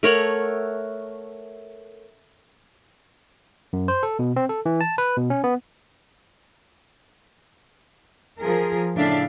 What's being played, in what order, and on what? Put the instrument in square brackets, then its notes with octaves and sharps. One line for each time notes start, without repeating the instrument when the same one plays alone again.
[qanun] A3 A#4 C#5 F#5
[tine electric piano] F#2
C5
A4
B2
C4
A4
E3
A5
B4
B2
C#4
B3
[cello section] F3 G#4 A#4
A2 C#3 D4 E5 F5